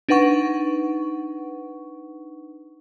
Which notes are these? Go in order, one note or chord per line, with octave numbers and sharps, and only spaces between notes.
D4 D#4 B4 F#5 C#6